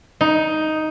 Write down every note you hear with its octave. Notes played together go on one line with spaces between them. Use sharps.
D#4